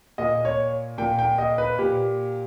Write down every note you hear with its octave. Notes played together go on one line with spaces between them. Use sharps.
A#2 D#5
C#5
A#2 G5
G5
D#5
B4
A#2 G4